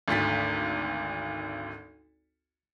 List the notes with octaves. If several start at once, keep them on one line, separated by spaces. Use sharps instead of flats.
G#1 D2 A6 B6